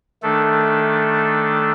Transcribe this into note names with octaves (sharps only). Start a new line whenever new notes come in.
D#3 A3 D4 A4